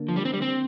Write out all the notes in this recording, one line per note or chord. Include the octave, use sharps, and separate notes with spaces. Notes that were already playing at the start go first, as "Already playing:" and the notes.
Already playing: D3 A#3 D4
F3
G3
C4
G3
C4